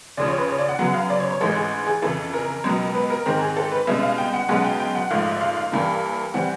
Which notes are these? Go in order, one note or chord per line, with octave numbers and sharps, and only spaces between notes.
D#2 C#3 F3 D5
C#5
B4
C#5
D5
F#5
F#2 C#3 F#3 B3 F#5
F5
D5
C#5
C#5
A1 G#2 E3 G#3 A4
G#4
G#4
F2 C#3 E3 A4
A#4
C#2 B2 F#3
B4
A#4
G#2 D#3 G#3 C4 A#4
G#4
A4
B4
C2 B2 G#3 C#4 E5
F5
G5
F#5
B1 B2 G#3 C#4 F#5
G5
G5
F#5
A#1 G#2 F3 A3 F5
F5
E5
F5
F5
G2 E3 G3 A#3
E3 G3 C4 F#5